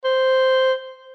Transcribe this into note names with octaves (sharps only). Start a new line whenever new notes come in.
C5